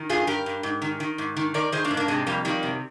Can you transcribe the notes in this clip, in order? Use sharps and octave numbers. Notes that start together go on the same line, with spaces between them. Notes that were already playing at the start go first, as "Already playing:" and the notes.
Already playing: D#3
G2 F4 G#4
G2 G4 A#4
G2
G#2
D#3
D#3
G#2
D#3
D#3 A#4 D5
D#3 G#4 C5
A#3 D4
G#2
A#3 D4
C3 G#3 C4
F2 G3 A#3
D#3 G3 A#3
C3